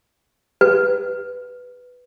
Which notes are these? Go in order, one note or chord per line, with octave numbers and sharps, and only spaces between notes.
B4